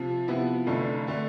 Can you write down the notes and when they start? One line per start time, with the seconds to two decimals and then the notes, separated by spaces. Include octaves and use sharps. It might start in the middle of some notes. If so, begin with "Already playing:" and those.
Already playing: C3 F3
0.28 C3 F3 B3 E4
0.67 F1 F2 D3 A3 D4
1.07 D3 A3 D4